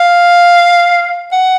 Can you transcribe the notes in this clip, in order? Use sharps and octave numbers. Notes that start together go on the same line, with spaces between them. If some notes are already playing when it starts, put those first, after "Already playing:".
Already playing: F5
F#5